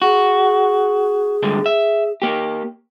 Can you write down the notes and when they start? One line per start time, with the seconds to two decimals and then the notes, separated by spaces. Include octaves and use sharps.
0.02 F#4 G#4
1.43 G2 D3 G#3
1.66 E5
2.22 A#3 G4